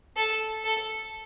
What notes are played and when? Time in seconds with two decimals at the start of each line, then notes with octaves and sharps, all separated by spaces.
0.17 A4
0.64 A4